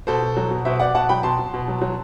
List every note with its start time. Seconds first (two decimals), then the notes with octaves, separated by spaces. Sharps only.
0.07 B2 A4 C5
0.22 B2
0.37 F#3
0.51 B2
0.65 B2 C5 E5
0.80 B2 D5 F#5
0.95 B2 F#5 A5
1.09 F#3 G5 B5
1.23 B2 A5 C6
1.39 B2
1.54 B2
1.68 F#3
1.82 F#3